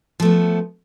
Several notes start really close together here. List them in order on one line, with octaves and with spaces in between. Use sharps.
F3 A3 B3